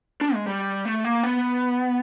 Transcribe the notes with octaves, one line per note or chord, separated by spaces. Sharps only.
D4
G#3
G3
A3
A#3
B3